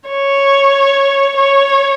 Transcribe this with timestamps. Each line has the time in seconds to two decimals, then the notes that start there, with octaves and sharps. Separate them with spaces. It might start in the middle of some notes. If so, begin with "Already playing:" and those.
0.10 C#5
1.37 C#5